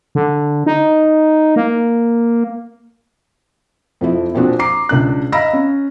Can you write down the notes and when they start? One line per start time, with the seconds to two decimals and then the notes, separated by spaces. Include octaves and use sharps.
0.15 D3
0.66 D#4
1.56 A#3
4.01 F2 F3 E4
4.35 A#2 F3 C4 D4 F#4
4.59 A#5 D6 C7
4.89 C#2 D4 F#6
5.32 D#5 F5 A#5 B5 E6 A#6
5.53 C#4